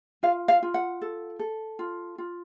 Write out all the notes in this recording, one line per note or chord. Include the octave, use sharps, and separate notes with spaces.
F4 F5
F5
F4
F#5
A4
A4
F4
F4